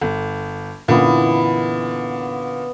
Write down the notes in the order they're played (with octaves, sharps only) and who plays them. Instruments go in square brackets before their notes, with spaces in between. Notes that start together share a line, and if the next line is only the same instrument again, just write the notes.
[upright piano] G1
[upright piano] F#2 A#2 D3 [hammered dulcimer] E3 B3